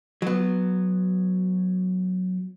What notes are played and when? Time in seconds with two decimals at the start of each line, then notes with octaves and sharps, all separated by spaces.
0.22 F#3 B3